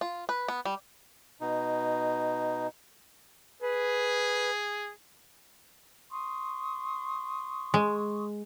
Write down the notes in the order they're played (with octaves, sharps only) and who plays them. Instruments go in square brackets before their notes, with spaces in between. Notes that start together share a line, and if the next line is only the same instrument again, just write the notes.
[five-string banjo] F4
B4
B3
G3
[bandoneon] B2 D#4
[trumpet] G#4 [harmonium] B4
[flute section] C6 C#6 D#6
[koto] G#3